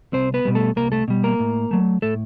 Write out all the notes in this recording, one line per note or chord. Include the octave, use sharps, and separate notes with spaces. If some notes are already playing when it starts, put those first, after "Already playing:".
C2 C4 C5
B3 B4
B2 G3
A3 A4
C2 A#3 A#4
A3 A4
B2 G3
A#3 A#4
A2
F#3 A3
A2 A3 A4